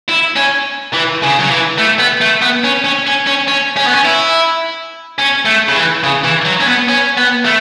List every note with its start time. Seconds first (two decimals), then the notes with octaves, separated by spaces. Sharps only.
0.09 E4
0.36 C#4
0.93 E3
1.23 C#3
1.39 F#3
1.50 E3
1.78 A3
1.99 B3
2.21 A3
2.42 B3
2.64 C#4
2.84 C#4
3.07 C#4
3.27 C#4
3.48 C#4
3.77 C#4
3.87 B3
3.95 C#4
4.05 E4
5.19 C#4
5.46 A3
5.69 C#3
5.76 E3
6.04 C#3
6.24 E3
6.45 F#3
6.60 C#4
6.67 B3
6.88 C#4
7.17 B3
7.45 A3